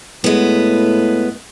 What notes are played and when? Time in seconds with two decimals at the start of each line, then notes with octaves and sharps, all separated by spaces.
0.24 A2 G#3 B3